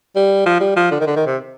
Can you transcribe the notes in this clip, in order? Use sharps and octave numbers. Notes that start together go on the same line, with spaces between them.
G3
F3
G3
F3
D3
D#3
D3
D#3
C3